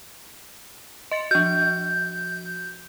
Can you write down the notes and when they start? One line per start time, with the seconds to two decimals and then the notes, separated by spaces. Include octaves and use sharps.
1.11 D#5 A6 C#7
1.31 F3 F#4 G6